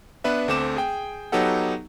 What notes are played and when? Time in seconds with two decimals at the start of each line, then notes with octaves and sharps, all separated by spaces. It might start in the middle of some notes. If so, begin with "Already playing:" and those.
0.24 B3 D4 B4 E5
0.48 D2 A3 C4 D6 E7
0.76 G#4 G5
1.32 F#3 B3 D#4 G4 A4 F#5